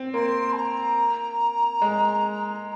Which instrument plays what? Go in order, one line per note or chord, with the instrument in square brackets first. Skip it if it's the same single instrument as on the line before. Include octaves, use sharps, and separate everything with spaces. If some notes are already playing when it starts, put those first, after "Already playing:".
Already playing: [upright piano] C4
[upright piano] A#3 [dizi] C6
[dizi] G#5
A#5
[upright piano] G#3